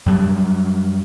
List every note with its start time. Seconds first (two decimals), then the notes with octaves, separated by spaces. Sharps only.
0.06 F#2 F#3 G3